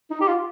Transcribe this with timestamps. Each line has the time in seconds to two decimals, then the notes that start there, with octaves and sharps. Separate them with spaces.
0.10 D#4
0.21 G4
0.28 F4